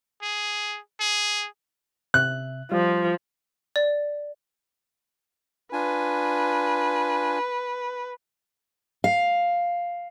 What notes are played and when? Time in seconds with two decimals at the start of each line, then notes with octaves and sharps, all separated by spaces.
0.22 G#4
1.00 G#4
2.14 C3 E5 F#6
2.72 F3 G3 F4
3.76 D5
5.73 D4 F4 B4 G#5
9.04 F5